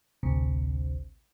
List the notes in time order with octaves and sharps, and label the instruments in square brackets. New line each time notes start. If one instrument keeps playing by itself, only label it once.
[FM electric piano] A1 D2 C3